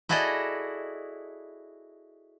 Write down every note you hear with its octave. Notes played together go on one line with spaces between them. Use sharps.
E4 F#4 G#4 A4 D5 D#5